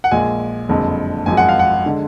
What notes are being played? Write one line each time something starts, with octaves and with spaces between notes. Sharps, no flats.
F#5
A#1 A#2 G#3 G#5
F#1 F2 D3 G#3
G#1 F#2 F3 G#3 G#5
F#5
F5
F#5
D3 G#3